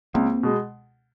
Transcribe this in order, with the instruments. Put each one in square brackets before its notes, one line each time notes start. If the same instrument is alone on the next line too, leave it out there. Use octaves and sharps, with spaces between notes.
[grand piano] C#2 [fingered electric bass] A#3 C4
[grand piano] B2 G#3